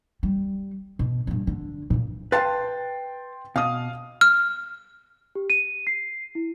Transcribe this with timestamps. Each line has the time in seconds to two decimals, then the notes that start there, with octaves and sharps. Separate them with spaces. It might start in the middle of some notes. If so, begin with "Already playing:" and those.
0.23 G3
0.99 B2
1.27 G2 A#2
1.47 D3
1.90 A#2 E3
2.32 B4 F5 G5 A5 C6 A6
3.56 B2 F5 D#6
4.21 F6
5.35 G4
5.50 D#7
5.87 C7
6.35 E4